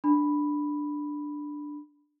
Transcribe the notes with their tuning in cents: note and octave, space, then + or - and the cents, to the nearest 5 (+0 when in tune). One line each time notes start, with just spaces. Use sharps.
D4 +5 B5 +0